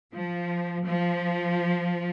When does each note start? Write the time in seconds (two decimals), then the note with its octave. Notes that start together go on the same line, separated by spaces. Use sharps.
0.15 F3
0.86 F3